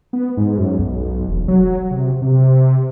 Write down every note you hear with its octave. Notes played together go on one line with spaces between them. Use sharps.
B3
G#2
F#2
B1
E1
F#3
C3
C3